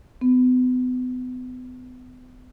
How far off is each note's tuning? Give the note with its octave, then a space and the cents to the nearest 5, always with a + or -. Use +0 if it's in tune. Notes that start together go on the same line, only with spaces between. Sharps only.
B3 +35